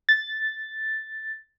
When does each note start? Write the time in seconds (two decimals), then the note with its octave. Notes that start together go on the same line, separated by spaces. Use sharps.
0.09 A6